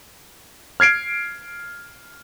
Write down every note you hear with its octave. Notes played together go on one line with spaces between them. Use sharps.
F6 G#6 C7 D7